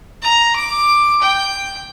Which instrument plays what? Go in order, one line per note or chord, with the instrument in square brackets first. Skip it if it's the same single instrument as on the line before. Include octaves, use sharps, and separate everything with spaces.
[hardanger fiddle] A#5
D6
G5